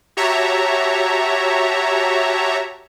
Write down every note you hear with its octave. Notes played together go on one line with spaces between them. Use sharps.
F#4 G4 C#5 E5 A5 A#5